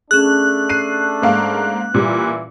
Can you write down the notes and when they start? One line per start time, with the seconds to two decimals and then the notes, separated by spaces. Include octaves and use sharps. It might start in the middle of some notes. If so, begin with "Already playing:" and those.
0.11 A3 C#4 D4 G#4 F#6
0.69 C7 D#7
1.22 G#2 A#3 F5
1.94 A#2 E3 G3